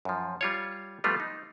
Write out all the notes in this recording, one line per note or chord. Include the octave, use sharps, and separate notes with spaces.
F#2 F3
G3 F4 C#5
F3 G3 A3 B3 F4
D#4